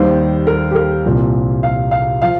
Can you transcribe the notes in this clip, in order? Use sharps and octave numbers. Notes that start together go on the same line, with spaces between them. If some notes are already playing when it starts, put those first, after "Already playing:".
Already playing: D#2 D#3 G3 C5
A#4
G4
A#4
C2 A#2 F3
F5
F5
F3 F5